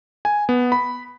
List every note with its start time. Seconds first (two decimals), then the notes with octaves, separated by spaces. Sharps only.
0.25 G#5
0.49 B3
0.72 B5